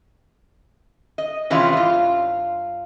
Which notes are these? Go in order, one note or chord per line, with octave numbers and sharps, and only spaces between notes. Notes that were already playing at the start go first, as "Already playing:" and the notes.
D#5
C3 E3 G#3 C#4 F4
G2 F4